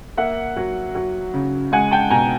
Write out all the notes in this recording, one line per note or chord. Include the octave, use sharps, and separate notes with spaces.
A#3 E5 F#5
F#3
F#3
C#3
G#3 F#5 G#5
G5 A5
B2 G#5 A#5